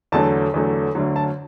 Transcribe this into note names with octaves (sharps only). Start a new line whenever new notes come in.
E2 D3 F#3 A3 A5
E2 D3 F#3 A3
D2 D3 F#3
A5